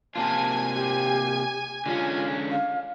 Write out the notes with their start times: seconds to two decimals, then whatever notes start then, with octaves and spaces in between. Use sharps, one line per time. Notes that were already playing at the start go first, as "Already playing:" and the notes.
0.16 C3 A#3 F4 G#5 A5
0.75 G4
1.86 D3 G#3 C#4 F4
2.51 F5